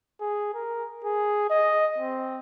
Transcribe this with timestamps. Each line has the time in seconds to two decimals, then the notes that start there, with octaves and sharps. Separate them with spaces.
0.21 G#4
0.54 A#4
1.04 G#4
1.50 D#5
1.99 C4